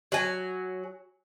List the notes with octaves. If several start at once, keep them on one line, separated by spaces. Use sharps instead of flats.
F#3 G#5